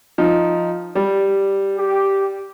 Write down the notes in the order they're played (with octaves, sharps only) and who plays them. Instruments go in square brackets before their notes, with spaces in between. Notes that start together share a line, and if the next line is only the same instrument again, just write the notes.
[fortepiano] F3 D#4
G3
[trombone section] G4